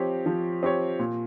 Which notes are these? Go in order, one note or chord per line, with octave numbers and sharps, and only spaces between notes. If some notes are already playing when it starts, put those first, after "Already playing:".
Already playing: F3 C4 G4 C#5
F3
C4 G4 C#5
A#2